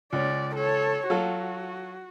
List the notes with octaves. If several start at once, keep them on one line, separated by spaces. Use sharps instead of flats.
C#2 C#4 D5
A4 C#5
F#3 F4 F#4 A4